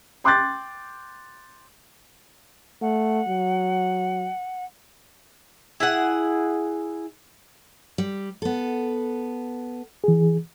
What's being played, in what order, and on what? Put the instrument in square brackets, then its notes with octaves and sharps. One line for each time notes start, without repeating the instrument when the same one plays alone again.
[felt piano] G5 C6 D6 F#6 G6 A6
[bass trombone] A3 [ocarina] F#5
[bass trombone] F#3
[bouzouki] E4 G#4 F#5
[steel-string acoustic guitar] G3
B3 A4
[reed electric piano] E3 G#4